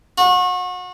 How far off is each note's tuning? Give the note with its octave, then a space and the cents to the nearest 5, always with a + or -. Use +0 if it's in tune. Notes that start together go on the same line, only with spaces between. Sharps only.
F#4 -35